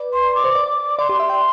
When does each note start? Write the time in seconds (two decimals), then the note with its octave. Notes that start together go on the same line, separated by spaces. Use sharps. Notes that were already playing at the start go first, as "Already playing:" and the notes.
Already playing: B4 D5
0.13 C6
0.35 D6
0.44 C5
0.55 D5
0.99 D5 C6
1.09 G4
1.20 E5
1.30 G5